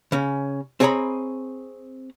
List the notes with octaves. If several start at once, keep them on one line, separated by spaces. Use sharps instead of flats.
C#3 C#4
C4 G#4 C#5 D#5 A#5 B5